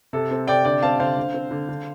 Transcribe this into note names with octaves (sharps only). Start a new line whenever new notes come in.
C3 A4
C4 A4
C3 D5 G5
D3 D5 G5
C4 F5 A5
D3 C5 F5
D3
C4
D3
D3